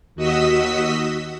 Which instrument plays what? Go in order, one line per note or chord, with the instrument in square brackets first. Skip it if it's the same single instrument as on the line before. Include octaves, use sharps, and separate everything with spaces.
[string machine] D#2 F#4 D#5 D#6 E6 B6